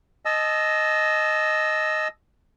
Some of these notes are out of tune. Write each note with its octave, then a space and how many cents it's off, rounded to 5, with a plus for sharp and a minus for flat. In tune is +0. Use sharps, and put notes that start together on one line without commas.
D#5 +0 A5 -30 E6 +0